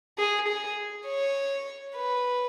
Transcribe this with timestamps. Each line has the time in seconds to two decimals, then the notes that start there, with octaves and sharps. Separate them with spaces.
0.18 G#4
0.48 G#4
1.07 C#5
1.96 B4